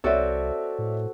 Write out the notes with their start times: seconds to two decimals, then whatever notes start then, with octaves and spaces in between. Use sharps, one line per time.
0.04 C2 C4 F#4 A4 C#5 D5 E5
0.78 A2